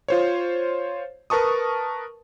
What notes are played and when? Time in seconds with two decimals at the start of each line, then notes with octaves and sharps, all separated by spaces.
0.08 F4 C5 C#5
1.30 A#4 B4 A5 C#6 D#6